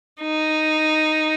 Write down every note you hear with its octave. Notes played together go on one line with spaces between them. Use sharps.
D#4